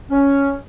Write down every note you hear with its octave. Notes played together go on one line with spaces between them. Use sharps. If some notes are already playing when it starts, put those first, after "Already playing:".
C#4